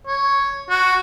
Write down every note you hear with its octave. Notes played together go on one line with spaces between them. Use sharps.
C#5
F#4